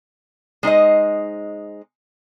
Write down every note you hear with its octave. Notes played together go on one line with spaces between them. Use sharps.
G#3 D#4 C5 D#5